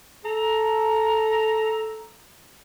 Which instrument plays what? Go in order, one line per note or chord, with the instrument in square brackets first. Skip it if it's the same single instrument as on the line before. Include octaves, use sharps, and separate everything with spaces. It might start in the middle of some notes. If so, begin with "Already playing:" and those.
[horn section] A4 A#5